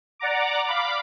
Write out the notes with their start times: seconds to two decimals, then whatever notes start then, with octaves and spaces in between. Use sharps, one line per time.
0.19 D5 F#5 A#5 D6
0.66 F5 B5 D6